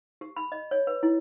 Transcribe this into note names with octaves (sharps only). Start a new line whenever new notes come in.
G4
B5
D#5
C#5
B4
E4